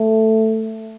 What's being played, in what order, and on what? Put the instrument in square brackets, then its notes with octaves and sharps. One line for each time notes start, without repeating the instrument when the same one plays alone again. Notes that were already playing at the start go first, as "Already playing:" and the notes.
Already playing: [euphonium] A3